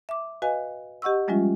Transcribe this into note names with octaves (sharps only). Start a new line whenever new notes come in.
E5 D6
F#4 B4 D#5 F5 G#5
G4 D#5 F#5 C#6 E6
F3 G3 G#3 C#4 F4 E5